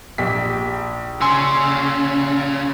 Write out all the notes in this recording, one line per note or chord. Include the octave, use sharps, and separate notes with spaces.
A#1 G4 B6
C#3 G#5 C6 E6